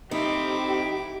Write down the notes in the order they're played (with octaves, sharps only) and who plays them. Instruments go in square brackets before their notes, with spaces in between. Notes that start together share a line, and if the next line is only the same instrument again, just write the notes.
[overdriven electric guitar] F2 C4 [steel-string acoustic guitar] D#4 [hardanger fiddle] E4 D6 [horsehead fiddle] G4